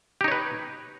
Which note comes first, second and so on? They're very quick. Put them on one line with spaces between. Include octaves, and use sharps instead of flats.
G4 D#4 C#5 B4